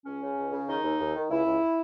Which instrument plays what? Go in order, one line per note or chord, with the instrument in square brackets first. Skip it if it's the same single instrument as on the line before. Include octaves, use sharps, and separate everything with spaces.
[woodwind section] C#2 C#4
C#3
C#2
C#3
D#3 D#4
D#2
D#2
D#3
C#2 E4
C#2